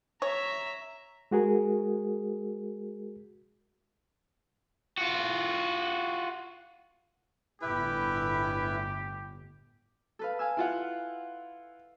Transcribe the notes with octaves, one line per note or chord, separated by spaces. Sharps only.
C#5 E5 A#5
G#3 F#4 G#4 A#4
F4 F#4
G1 A2 E4 G4 B4
A4 B4 F5
F5 G#5 E6
E4 F4 F5 F#5